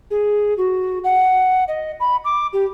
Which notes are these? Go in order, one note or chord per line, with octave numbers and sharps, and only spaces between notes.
G#4
F#4
F#5
D#5
B5
D6
G4